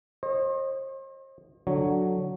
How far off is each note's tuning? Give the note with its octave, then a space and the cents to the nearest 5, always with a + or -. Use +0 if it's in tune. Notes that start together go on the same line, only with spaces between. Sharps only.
C5 +40 D#5 -15
D3 +0 F#3 +0 C#5 +0